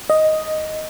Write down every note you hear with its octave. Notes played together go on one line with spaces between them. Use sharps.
D#5